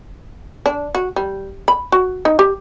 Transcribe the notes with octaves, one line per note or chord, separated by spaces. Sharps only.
D4
F#4
G3
B5
F#4
D#4
G4